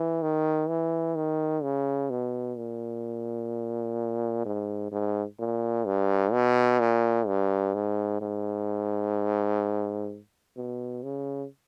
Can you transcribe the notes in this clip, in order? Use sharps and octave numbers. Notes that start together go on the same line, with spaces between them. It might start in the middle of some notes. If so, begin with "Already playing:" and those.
Already playing: E3
D#3
E3
D#3
C#3
B2
A#2
G#2
G#2
A#2
G2
B2
A#2
G2
G#2
G#2
B2
C#3